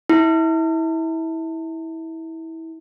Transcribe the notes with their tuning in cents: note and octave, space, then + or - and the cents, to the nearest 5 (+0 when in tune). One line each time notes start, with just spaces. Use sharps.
E4 -25